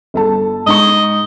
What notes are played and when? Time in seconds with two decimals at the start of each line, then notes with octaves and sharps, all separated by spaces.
0.14 G1 A4 A5
0.66 G#2 D#4 D#5 C#6